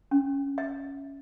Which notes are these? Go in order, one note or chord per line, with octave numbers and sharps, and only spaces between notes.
C#4
E5